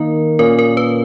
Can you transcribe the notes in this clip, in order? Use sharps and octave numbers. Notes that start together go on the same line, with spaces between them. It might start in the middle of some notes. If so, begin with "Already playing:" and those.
Already playing: D#3 A#3 D#4 A#4
A#2 A#3 C#4 A#4
A#4
B4